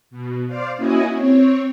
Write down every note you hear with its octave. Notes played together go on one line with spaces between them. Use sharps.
B2
C5 D5 F5
A#3 C#4 E4 F#4 D#5 G#5
C4 C#5